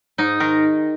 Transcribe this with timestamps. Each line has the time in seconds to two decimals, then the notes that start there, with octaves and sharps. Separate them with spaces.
0.18 G#2 D#4
0.40 D#3 A#4